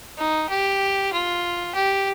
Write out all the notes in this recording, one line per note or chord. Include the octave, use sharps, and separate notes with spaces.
D#4
G4
F4
G4